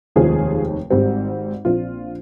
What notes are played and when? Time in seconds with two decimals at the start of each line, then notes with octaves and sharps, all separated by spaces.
0.16 F1 D#2 D#3 G#3 C4 F4 G#4
0.90 G#1 G#2 G3 C4
1.65 A#1 A#2 F3 C4 F4